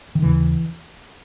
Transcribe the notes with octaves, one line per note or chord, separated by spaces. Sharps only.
D#3
D#2 C#3 E3